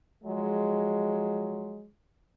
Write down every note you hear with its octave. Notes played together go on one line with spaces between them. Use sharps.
F3 F#3 G#3